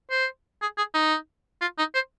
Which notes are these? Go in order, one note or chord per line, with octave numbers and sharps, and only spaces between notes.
C5
G#4
G#4
D#4
F4
D#4
C5